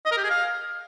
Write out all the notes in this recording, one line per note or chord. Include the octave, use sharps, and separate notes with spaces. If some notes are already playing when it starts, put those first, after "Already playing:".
D#5
A#4
G4
G#4
F5